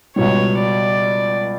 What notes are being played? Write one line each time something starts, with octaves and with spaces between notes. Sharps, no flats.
C#2 B2 G3 C#5
D5